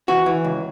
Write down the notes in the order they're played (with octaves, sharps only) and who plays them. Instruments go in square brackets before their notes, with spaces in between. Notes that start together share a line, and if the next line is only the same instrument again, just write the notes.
[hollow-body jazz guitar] E3 F#4
E3
C#2